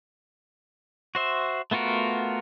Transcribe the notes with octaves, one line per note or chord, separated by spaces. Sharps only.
F#4 C5 E5
A3 B3 F4 F#4 A#4